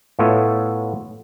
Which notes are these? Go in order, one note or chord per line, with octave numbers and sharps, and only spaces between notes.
A2 B3 F4 A4 C#5 E5